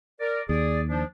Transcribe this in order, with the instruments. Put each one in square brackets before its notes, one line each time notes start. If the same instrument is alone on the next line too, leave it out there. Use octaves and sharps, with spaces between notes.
[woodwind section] A#4 D5
[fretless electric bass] D#2 [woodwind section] G#4 D5
[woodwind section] F3 D4